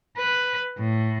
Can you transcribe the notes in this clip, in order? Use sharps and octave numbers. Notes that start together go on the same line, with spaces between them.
B4
A2